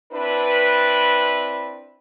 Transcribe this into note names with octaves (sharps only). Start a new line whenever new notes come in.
C4 D4 E4 B4